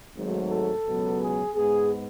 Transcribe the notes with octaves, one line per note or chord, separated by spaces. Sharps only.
G#1 G#2 F#3 A3
A4
C#2 B2 F#3 B3
G#4
G#2 G#3 B3 G#4